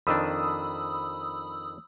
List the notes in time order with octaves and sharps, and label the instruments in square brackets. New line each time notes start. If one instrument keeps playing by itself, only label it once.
[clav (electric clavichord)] F2 D#3 D4 [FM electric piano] B5 D#6 E6